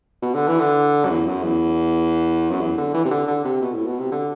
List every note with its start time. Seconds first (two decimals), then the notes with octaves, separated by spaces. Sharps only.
0.22 B2
0.34 D3
0.48 E3
0.60 D3
1.04 F#2
1.10 E2
1.26 F#2
1.43 E2
2.50 F#2
2.61 E2
2.78 D3
2.94 E3
3.05 C3
3.11 D3
3.28 D3
3.45 C3
3.62 B2
3.74 A2
3.86 B2
3.99 C3
4.12 D3